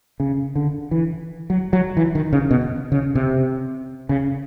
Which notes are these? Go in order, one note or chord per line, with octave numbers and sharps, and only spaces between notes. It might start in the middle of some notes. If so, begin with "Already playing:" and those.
C#3
D3
E3
F#3
F#3
E3
D#3
C#3
B2
C#3
C3
C#3